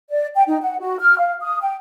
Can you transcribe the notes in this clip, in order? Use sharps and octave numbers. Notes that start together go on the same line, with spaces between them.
D5
G5
D#4
F#5
F#4
F6
F5
D#6
G5